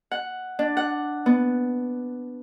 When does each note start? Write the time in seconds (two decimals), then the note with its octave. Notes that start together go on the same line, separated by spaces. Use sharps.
0.11 F#5
0.59 D4
0.77 F#5
1.26 B3